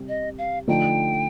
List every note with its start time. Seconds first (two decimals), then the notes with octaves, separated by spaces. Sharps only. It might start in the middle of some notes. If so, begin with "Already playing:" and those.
Already playing: C3 G3 G4
0.08 D#5
0.38 F5
0.68 D3 F3 A3 D#4 G5